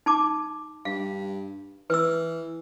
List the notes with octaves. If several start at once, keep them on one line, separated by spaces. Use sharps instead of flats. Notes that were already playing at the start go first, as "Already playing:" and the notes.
D#4 A5 D6
G2 F5
E3 B4 E6